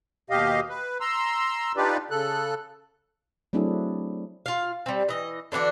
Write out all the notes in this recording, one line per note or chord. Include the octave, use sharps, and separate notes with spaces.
D#2 B2 G4 D#5 F5
B4
A#5 C6 E6
D4 D#4 F4 G4 B4 D5
C#3 A4 F#6
F#3 A3 C4 D4 E4 G#4
F4 F5
G3 C4
E3 D#5
D3 E3 D4 F#4